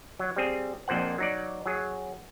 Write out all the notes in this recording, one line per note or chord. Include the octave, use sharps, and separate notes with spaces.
F#3
G3 C4 G#4
A#1 F2 A#2 C5 F#5
F#3 D#4 D5
F#3 G#4